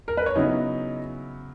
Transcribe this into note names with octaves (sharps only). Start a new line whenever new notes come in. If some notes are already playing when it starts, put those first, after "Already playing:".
A#4
B4
C#5
C#3 F#3 B3 D#4 E4 D#5